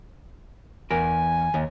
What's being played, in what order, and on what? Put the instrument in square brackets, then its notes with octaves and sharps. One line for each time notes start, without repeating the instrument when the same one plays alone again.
[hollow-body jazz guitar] E2 A#4 [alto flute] G#5
[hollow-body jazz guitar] D#2